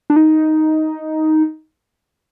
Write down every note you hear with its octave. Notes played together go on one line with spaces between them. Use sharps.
D4
D#4